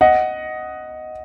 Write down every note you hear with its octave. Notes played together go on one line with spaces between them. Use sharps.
D#5 F#5